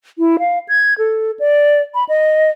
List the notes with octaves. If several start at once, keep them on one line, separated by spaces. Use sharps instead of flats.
E4
F5
G#6
A4
D5
B5
D#5